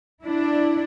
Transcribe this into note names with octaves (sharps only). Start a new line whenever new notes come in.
D4 E4